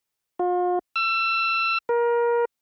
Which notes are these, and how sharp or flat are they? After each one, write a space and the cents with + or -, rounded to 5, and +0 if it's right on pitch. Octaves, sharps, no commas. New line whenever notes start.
F4 +40
E6 +30
A#4 +25